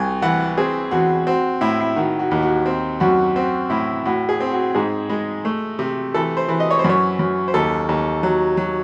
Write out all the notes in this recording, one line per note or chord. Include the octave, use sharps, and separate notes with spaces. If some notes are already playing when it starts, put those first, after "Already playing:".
Already playing: C2 G#5
E3 F#5
C4 G#4
E2 F#4
C4 F#4
A2 E4
E4
D#3 F#4
F#4
D#2
F#4
C4
F#2 F#4
C4 F#4
A2 E4
A2 F#4
G#4
C4
F#4
G#2 G#4
G#3
A3
C3
E3 A4
C5
E3
D#5
C#5
C5
F#2 C#5
F#2
C5
D#2 A4
D#2
F#3
F#3